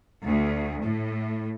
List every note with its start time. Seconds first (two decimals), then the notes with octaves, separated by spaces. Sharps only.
0.25 D2
0.82 A2